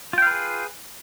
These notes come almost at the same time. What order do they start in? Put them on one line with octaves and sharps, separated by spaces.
F4 G5 F5 B4 G#4